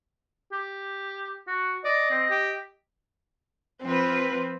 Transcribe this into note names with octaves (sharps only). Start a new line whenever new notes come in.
G4
F#4
D5 D#5
C4
G4
F3 C4 F4 B4